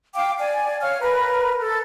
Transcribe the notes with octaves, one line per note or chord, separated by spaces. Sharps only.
F5 G5 D6
D5 G#5
C#5 F5 F6
A#4 B4
A4